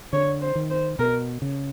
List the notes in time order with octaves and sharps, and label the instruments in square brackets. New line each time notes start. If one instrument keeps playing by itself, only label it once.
[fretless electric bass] D3 [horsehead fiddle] C#5
[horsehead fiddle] C5
[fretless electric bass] D#3
[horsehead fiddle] C5
[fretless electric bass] B2 [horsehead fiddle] A#4
[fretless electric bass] C#3